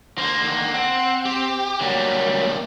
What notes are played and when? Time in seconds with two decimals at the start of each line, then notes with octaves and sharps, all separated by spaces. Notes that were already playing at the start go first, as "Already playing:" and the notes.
0.18 D2 A#3 C5
0.41 D3 D#3
0.74 C4 F#5
1.25 G4
1.81 D2 F#3 G3 A#3